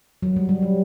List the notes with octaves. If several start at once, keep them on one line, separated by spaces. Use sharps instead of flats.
F#3
G3
G3
F#3